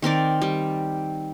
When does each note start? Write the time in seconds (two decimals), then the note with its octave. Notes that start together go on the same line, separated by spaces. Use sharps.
0.02 D#3 C4 A#4 D5
0.42 G3